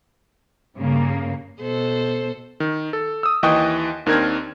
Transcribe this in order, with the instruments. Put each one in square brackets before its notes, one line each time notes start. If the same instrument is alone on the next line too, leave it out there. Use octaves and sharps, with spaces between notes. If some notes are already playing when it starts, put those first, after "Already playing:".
[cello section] G2 C#3 A#3
[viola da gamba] B2 A4 C5
[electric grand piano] D#3
A4
D#6 E6
D#2 E3 D#5 G5 C#6 D#6
D#2 D#3 C4 D4 A#4 G#6